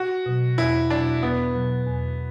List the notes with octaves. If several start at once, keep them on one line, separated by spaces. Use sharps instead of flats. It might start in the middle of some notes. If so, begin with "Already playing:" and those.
Already playing: F#4
B2 F#3
E2 E4
B2 F#3 D4
E2 B3
B2 F#3
E2